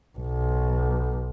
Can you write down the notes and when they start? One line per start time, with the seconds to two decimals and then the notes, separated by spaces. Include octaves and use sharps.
0.19 B1